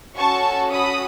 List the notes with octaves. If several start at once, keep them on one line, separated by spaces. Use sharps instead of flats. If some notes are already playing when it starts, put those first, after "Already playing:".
C#4 F#4 A4 A5 C#6
B5 D#6